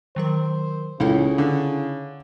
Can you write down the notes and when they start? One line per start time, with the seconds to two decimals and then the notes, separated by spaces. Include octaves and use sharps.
0.16 D#3 F#3 A#4 C5
1.00 C#2 C#3 D#4 E4 A4
1.38 D3